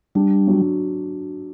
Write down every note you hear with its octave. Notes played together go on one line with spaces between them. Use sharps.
G3 D4
F#3